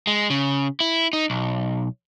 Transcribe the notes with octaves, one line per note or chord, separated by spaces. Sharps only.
G#3
C#3
E4
D#4
B1